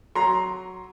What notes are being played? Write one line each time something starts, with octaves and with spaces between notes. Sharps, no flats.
F#3 A#5 C6